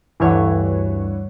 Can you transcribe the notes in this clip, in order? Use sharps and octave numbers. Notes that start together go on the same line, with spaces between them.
D2 G2 E3 C#5 F#5